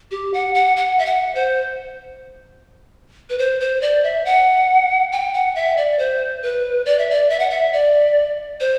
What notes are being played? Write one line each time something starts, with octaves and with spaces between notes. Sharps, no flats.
G4
F#5
F#5
F#5
E5
F#5
C5
B4
C5
C5
D5
E5
F#5
G5
F#5
E5
D5
C5
B4
D5
E5
D5
E5
F#5
E5
D5
C5